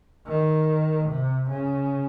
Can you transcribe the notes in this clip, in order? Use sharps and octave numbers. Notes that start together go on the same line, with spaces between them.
D#3
C3
C#3